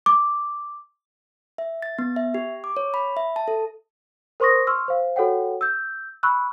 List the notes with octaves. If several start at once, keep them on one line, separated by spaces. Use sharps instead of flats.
D6
E5
A6
B3
E5
G4
D6
C#5
B5
E5
A5
A4
A#4 C5 C6 C#6 D#6 A#6
C6 C#6 E6 F6
C5 F5
F#4 A4 C#5 F#5 G5
E6 G6
B5 C#6 E6 F#6